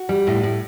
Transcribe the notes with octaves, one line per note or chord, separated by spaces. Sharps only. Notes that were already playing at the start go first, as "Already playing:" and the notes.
Already playing: F#4
G3
A2
A2